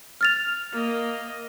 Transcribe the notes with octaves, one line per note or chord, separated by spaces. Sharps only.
F6 A6 F7
A#3 D#5